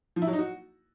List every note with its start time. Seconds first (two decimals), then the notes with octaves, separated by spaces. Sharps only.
0.16 F3
0.22 E4
0.27 F#3
0.33 D#4
0.39 F#4